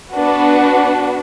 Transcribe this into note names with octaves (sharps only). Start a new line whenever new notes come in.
B3 D4 F#4 B4